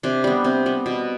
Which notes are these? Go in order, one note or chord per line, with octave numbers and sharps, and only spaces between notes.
C3 D4
G3 B3 D4
C3 C4
G3 B3
B2